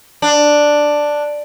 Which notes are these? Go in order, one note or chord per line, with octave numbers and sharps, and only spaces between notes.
D4